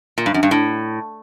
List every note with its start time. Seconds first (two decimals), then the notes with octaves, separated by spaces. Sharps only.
0.18 A#2
0.26 G2
0.34 F#2
0.43 G2
0.51 A2